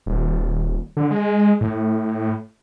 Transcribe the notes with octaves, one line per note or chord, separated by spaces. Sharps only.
D#1
D3
G#3
A2